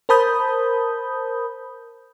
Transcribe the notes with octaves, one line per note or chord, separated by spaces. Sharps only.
A#4 C5 A5 B5 D#6 G6